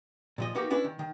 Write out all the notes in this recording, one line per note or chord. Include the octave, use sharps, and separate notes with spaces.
A#2 F3 D#5
A#3 B3 D#4 F#4 G4 A#4
C#4 D4 E4 B4
D#3
D#3